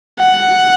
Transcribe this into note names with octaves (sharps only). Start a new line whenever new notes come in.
F#5